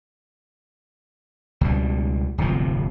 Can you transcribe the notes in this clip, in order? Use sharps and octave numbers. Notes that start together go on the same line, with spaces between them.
C#2 B2 G3
D1 G1 C3 F3